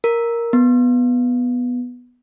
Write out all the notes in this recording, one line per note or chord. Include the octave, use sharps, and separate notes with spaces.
A#4
B3